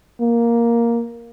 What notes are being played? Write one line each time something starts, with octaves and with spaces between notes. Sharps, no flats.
A#3